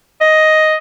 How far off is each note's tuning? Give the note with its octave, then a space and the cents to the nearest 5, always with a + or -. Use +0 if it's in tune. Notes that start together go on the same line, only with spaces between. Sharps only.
D#5 +5